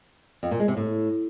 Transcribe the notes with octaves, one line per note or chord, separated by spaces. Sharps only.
F2
A#2
G#3
C3
A2